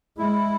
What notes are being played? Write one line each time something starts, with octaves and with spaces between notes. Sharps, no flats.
G#3 E4